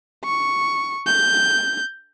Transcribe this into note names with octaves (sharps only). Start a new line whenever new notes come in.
C#6
G6